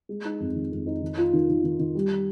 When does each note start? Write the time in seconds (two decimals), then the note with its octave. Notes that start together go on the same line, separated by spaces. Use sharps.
0.09 G#3
0.25 D#4
0.40 F2
0.55 D#3
0.71 F2
0.86 D#4
1.02 D#3
1.17 F4
1.33 D#3
1.49 D#3
1.64 D#3
1.79 D#3
1.95 G3